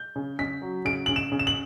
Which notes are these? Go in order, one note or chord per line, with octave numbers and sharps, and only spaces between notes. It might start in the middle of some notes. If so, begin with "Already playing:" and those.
Already playing: G6
C#3
C#3 B6
F#3
C#3 D7
C#3 F#7
E7
C#3
E7
F#7